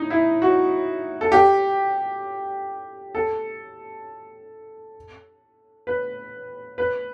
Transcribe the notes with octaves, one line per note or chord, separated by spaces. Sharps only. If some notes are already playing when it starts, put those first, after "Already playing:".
Already playing: D#4 E4
E4
F#4
A4
G4
A4
B4
B4